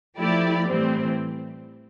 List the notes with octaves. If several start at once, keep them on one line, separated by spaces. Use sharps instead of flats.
F3 A3 E4 G4 D5
A2 E3 G3 C4